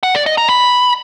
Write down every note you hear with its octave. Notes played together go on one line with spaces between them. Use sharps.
F#5
D5
D#5
A#5
B5